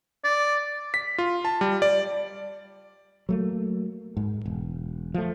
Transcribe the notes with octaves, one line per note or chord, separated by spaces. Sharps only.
D5
B6
F4
A5
G3
D5
F#3 A3 A#3
G#2
E1
F3 A3